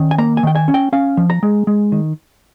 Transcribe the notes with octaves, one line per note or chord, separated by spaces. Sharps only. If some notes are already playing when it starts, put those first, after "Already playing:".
Already playing: D#3 C#4
G#5
A#3 A#5
G#5
D#3 G5
G#5
C#4
G5
C#4 F5
F3
A#5
G#3
G#3
D#3